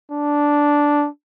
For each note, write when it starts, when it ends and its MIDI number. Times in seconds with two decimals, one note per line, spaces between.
0.11 1.08 62